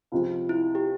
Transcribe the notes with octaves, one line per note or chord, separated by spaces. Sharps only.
C#2 C3 F3
E4
G4